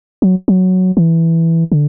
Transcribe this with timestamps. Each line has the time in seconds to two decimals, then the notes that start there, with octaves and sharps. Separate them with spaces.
0.22 F#3
0.48 F#3
0.97 E3
1.72 D3